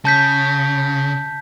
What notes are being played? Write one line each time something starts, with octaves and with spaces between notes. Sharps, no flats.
C#3 A5 G6 B6